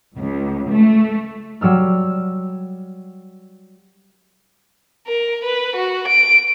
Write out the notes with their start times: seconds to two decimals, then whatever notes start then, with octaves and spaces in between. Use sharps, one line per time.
0.17 C#2
0.71 A3
1.61 F#3 G3 E6 F6
5.07 A#4
5.44 B4
5.76 F#4
6.08 D7